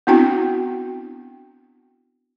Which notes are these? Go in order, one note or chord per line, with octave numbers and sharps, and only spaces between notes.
B3 C4 D4 E4 F#4 G5